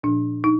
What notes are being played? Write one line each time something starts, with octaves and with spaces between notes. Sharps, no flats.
A#2 F3 D4
D#4